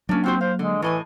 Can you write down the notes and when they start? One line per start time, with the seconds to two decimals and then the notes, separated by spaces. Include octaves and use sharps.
0.09 F#3 A#3 C#4 D4
0.24 C4 F4 F#4 C5
0.41 C5 F5
0.59 D3 G#3
0.82 A2 E3 D#5 G#5